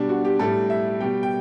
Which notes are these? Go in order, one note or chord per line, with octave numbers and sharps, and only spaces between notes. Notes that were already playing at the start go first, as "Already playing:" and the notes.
Already playing: B2 G3 D4
F#4
G4
A2 G3 A4
E5
B2 G3 G5
G5